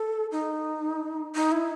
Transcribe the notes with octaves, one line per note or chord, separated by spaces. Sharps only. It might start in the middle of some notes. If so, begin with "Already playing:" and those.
Already playing: A4
D#4
D#4
E4